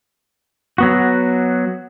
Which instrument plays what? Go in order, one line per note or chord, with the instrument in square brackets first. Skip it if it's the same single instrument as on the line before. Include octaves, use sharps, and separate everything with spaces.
[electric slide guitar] F#3 B3 F#4